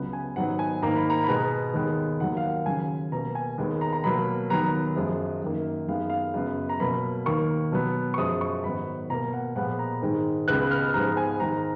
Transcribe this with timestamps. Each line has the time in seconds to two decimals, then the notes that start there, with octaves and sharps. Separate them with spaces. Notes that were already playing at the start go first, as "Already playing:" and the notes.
Already playing: C#2 C#3 F#3 B3
0.13 G#5
0.36 G#2 D#3 F#3 B3 F#5
0.59 G#5
0.82 G#2 D#3 A#3 A#5
0.96 B5
1.10 A#5
1.24 B5
1.28 B2 G#3 B3 A#5
1.74 D#2 D#3 G#3 B3
2.20 D#2 D#3 F#3 A#3 F#5
2.37 F5
2.43 F#5
2.66 D#2 C#3 F#3 G#5
3.12 B2 A#5
3.16 A#3
3.35 G#5
3.58 D#2 D#3 G#3 B3
3.81 A#5
3.93 A#5
4.04 B2 F#3 A#3 B5
4.50 D#2 D#3 F#3 B3 A#5
4.96 F#2 F3 G#3
5.42 F#2 D#3 A#3
5.88 F#2 D#3 G#3 B3 F5
6.10 F5
6.34 F#2 C#3 G#3 B3
6.69 A#5
6.80 B2 F#3 A#3 B5
7.26 D#2 D#3 A#3 C#6
7.72 B2 F#3 B3
8.14 C#6
8.18 F#2 F3 G#3 D#6
8.41 C#6
8.64 G#2 D#3 F#3 B3 B5
9.10 B2 A#5
9.14 A#3
9.33 F#5
9.56 A#2 F3 G#3 B3 F#5
9.79 A#5
10.02 G#2 D#3 G#3
10.48 C#2 C#3 G#3 B3 F#6
10.71 F6
10.94 G#2 F3 G#3 B3 A#5
11.17 G#5
11.40 G#2 D#3 G#3 A#5
11.58 A#5